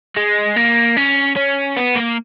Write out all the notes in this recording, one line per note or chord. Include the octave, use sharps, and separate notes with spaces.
G#3
A#3
C#4
C#4
B3
A#3